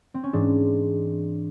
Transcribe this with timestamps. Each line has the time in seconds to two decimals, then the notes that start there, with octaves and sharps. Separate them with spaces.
0.14 C4
0.23 C#4
0.33 G#2 E3 D4